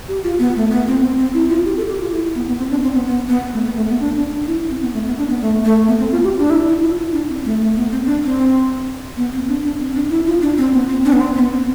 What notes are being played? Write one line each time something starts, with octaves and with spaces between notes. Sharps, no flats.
G4
F4
B3
A3
B3
C4
C4
C4
E4
F4
G4
A4
G4
F4
E4
B3
B3
C4
D4
C4
B3
B3
B3
A3
B3
A3
B3
D4
D4
D4
E4
C4
B3
A3
B3
D4
B3
A3
A3
B3
C4
F4
G4
D4
E4
E4
F4
E4
D4
C4
A3
A3
B3
C4
D4
C4
B3
C4
D4
D4
C4
D4
E4
F4
D4
C4
B3
C4
D4
B3
C4
B3
C4